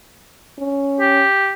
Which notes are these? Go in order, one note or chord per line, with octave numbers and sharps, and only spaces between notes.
C#4
G4